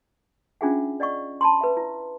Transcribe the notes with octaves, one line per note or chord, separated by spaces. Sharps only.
C#4 D4 F4 G#4 E5 F#5
D5 D#5 F#5 C#6
A5 B5 C6
B4 E5
E4